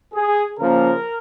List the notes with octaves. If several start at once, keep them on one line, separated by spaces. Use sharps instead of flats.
G#4
C#3 F3 A#3 A#4